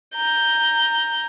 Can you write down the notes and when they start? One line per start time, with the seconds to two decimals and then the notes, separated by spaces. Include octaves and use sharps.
0.16 A#5 G6